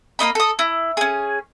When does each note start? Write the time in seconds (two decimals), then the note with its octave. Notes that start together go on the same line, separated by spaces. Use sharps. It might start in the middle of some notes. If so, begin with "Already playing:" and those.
0.19 A#3 C#4 D#5 B5
0.35 A4 D#6
0.59 E4
0.97 C#4 G#4